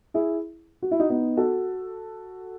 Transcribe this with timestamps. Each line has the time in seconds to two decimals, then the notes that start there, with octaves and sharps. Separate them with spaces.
0.14 E4 G#4
0.82 F#4
0.91 E4
1.00 D#4 F#4
1.10 B3 D#4
1.37 F#4 A4